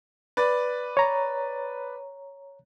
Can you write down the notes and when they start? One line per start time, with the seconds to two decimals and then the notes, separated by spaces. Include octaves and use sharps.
0.37 B4 D5
0.97 C#5 A#5